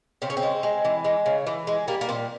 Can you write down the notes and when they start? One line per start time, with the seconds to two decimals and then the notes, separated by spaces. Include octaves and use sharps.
0.22 C#3 C4
0.30 C#4
0.37 C4
0.43 G#3
0.63 G#3
0.85 E3
1.05 G#3
1.26 C#3
1.47 E3
1.67 G#3
1.88 G3 A#3
2.01 A#3
2.09 A#2 C4